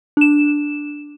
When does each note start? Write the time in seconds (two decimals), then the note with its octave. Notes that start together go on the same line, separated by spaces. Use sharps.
0.17 D4 E7